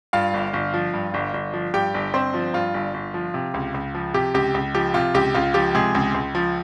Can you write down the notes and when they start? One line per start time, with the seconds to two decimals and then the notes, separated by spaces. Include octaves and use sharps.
0.13 G2 F4 F5
0.34 G1
0.53 G1
0.74 F3
0.94 G2
1.14 G1
1.34 G1
1.54 F3
1.74 G2 G4 G5
1.94 G1
2.14 G1 C4 C5
2.34 F3
2.54 G2 F4
2.74 G1
2.94 G1
3.14 F3
3.34 C3
3.54 C#2
3.74 C#2
3.95 F3
4.14 C3 G4
4.34 C#2 G4
4.54 C#2
4.75 F3 G4
4.94 C3 F4
5.14 C#2 G4
5.34 C#2 F4
5.54 F3 G4
5.74 C3 G#3 G#4
5.95 C#2
6.14 C#2
6.35 F3